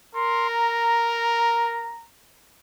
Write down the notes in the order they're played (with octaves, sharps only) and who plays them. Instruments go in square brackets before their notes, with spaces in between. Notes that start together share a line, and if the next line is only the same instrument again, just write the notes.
[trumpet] A#4 [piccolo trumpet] C6
[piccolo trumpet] A#5